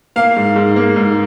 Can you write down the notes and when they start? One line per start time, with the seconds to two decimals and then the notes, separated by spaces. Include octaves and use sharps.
0.16 A#3 F5
0.36 G#2
0.56 G#2
0.76 A#3
0.96 G#2